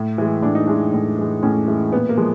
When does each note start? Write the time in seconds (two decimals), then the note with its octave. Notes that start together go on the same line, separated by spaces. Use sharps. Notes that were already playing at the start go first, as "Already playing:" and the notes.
Already playing: A2
0.18 E3 G#3
0.42 A2 D4
0.55 D#4
0.67 E3 G#3 D4
0.93 A2
1.18 E3 G#3
1.43 A2 C#4
1.68 E3 G#3
1.92 A#2 B3
2.09 A#3
2.17 F3 G#3